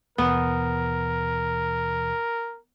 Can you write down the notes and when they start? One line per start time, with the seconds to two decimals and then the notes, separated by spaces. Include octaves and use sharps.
0.18 D#2 B2 E3 B3 A#4